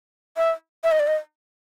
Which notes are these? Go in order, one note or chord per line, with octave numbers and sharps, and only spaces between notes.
E5
E5
D#5
D5
D#5